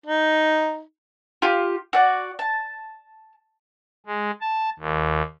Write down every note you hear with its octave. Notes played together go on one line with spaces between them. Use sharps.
D#4
F4 G4
F#4 D5
A5
G#3
A5
D#2